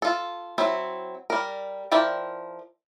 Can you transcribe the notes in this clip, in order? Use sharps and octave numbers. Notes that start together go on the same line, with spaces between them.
F4 A4
F#3 C4 E4
G3 A#4
F3 E4 A#4 D5 G5